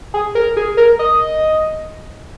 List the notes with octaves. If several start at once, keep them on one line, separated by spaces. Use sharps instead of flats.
G#4
A#4
G#4
A#4
D#5